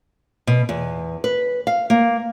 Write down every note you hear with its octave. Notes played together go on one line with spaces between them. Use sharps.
B2
E2
B4
F5
A#3